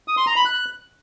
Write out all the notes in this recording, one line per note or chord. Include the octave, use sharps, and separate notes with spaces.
D#6
C6
A#5
B5
F#6